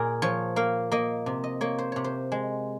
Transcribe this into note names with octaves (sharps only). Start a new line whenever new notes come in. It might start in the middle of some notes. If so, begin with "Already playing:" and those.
Already playing: A#2 G#4 A#4
F3 C#5
A#3 F5
A#3 D#5
C3
D#5
A#3 C#5
C5
C3 C#5
C5
G#3